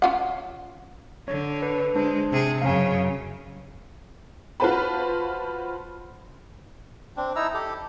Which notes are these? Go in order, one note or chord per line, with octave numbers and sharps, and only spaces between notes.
C#4 F4 F#5
D3 C#5
B4
G#3 D4 C5
C3 G#4
F#2 C#3 F5 G#5
F4 F#4 B4 C5 A5 B5
C4 D4
D#4 E4 A#5 E6
G4 A4